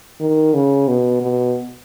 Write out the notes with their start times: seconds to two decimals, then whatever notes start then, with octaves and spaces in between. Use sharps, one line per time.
0.20 D#3
0.54 C#3
0.88 B2
1.22 B2